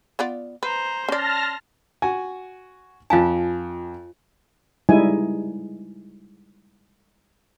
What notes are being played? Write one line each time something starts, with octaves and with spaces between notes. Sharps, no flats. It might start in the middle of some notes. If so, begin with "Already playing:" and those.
B3 F4 D5
B4 C5 A#5
C#4 D5 A5 C6 F6 A#6
F#4 G#5
F2 F4 F5 G#5 A5
G3 G#3 D#4 E4 G#5